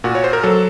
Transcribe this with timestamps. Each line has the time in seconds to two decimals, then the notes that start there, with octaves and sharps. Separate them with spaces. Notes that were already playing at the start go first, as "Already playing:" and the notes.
0.04 A#2 F#4
0.15 C#5
0.24 C5
0.33 A#4
0.43 F#3 A4